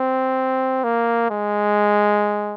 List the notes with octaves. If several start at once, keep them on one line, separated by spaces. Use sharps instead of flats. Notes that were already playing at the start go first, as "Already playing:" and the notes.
Already playing: C4
A#3
G#3